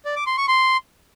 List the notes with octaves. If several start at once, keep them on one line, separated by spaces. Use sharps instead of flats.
D5
D6
C6
C#6
C6